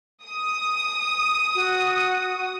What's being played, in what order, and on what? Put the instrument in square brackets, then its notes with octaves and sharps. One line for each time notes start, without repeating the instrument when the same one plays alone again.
[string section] D#6
[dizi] F#4